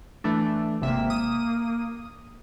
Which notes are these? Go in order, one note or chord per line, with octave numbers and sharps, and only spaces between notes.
E3 A3 D4
G#1 C3 A#3 E5
D#6